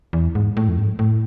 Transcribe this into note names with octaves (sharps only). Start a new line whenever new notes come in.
E2
G#2
A2
F2
G#2
A2